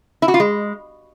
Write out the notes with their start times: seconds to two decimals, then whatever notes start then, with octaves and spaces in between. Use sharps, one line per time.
0.22 E4
0.28 F#4
0.34 F4
0.40 G#3